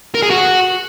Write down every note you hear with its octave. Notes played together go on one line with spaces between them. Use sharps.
A#4
G#4
F#4